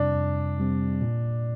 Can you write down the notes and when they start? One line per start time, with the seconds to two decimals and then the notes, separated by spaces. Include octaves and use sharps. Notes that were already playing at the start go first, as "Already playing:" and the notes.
Already playing: F2 C3 G3 C4 D4
0.15 F2
0.58 C3 G3 C4
1.02 A#2